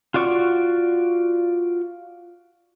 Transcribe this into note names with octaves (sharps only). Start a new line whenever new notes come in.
F4 F#4 D5 C#6